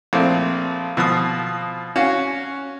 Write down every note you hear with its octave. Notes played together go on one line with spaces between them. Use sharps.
A#1 A3 C4
B2 F3 F5 D#6
C#4 F#4 F5